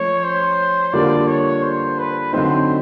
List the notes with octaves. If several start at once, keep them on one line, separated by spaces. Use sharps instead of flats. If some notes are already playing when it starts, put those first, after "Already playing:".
Already playing: F3 A3 C#4 C#5
C5
D3 G3 A#3 D4 F4 D5
C#5
C5
B4
D3 F#3 A3 C4 D#4 C5